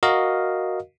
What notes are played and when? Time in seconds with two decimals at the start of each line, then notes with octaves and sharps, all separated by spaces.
0.03 F#4 A#4 D#5 F5